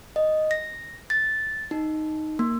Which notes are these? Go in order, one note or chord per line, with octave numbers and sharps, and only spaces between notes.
D#5
A#6
A6
D#4
A#3